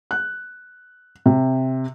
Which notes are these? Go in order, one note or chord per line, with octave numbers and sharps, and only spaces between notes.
F#6
C3